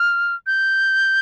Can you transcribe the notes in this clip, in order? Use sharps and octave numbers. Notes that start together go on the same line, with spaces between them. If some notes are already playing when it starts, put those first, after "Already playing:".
Already playing: F6
G6